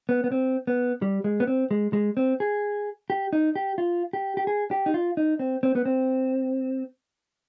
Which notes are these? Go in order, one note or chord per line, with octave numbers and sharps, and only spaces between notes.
B3
B3
C4
B3
G3
G#3
B3
C4
G#3
G#3
C4
G#4
G4
D#4
G4
F4
G4
G4
G#4
G4
D#4
F4
D#4
C4
C4
B3
C4